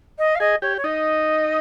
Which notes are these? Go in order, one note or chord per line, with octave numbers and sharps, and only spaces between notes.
D#5
F5
G#4 D#5
G4 C#5
C#5
D#4 D#5